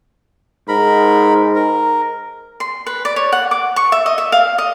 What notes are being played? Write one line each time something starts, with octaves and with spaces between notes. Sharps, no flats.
G#2 A#4 B5
A#4
C6
B4
D5
C#5
F#5
D6
C#6
E5
D#5
E5
F5
D#5